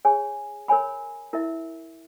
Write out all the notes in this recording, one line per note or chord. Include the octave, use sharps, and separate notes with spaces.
G#4 C#5 G#5
A#4 C#5 G#5 B5
E4 A#4 E5